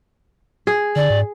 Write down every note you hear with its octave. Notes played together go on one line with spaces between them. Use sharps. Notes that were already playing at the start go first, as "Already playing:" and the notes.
G#4
D3 D5
G#2